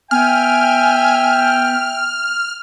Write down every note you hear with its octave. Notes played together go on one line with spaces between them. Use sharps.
B3 E5 G5 G#5 F6